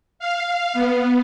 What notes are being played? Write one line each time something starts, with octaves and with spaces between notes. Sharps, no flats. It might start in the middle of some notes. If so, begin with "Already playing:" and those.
F5
B3